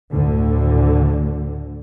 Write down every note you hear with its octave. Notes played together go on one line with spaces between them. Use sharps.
D2 A2 D3